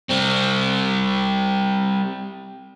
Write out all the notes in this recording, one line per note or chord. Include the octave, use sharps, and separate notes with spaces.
G3 C4